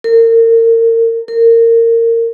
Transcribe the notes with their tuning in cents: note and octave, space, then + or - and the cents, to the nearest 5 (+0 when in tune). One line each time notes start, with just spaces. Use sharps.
A#4 -35
A#4 -25